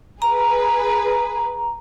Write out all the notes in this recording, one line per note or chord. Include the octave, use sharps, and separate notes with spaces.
G#4 B4 A#5